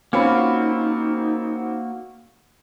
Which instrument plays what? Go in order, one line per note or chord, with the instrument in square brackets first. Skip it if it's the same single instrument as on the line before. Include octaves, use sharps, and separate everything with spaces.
[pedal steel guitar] A#3 F#4 [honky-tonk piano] C4 C#4 [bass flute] D#4 [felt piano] F4 B5